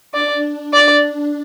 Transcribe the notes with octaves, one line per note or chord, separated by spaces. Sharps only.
D4 D5
D4 D5